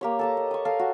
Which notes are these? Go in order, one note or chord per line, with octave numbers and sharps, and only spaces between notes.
A#3 G4 C#5
A4 A5 A#5
D#5
C#6 D#6
A4 A#4 F5
F#4